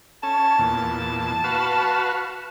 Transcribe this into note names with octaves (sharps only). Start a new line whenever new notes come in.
C#4 A5
E2 A#2
F#4 B4 F5